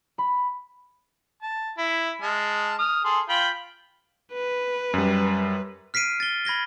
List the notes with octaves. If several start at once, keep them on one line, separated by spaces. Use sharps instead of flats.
B5
A5
E4
G#3 A5 F6
D#6 F6
G#4 A4 C6
F4 G5 B5
B4
F#2 G3
F6 B6 C7 D7 D#7
A6 G7
B5 G#6 A#6 G7